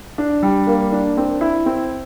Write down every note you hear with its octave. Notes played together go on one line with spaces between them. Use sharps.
D4
G3
A#3
D4
C4
E4
C4